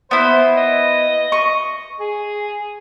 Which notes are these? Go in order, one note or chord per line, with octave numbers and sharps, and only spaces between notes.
B3 E4 C5
D#5
C#6
G#4